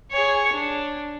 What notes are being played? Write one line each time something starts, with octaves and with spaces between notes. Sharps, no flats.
G#4 C#5
D4